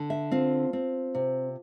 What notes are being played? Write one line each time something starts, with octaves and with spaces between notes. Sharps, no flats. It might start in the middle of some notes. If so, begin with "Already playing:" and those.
Already playing: D3
E5
C4 F4
C4
C3